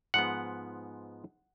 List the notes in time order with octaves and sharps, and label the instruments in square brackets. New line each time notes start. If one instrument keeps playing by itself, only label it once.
[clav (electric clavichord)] G#2 F3 G#3 B3 F#5